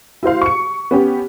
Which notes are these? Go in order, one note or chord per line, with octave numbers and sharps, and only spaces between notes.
E4 F#4 C5 F5
C#6 C#7
B3 C#4 G4